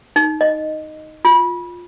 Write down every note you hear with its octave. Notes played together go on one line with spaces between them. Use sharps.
D#4
D#5
F4